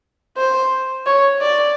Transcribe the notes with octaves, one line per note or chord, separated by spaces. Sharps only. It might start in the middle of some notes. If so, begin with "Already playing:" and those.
C5
C#5
D5